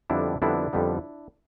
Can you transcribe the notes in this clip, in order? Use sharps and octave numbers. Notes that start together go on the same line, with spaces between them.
F2 D3 G3 B3 D4 E4
F2 D3 G3 B3 D4 E4
F2 D3 G3 B3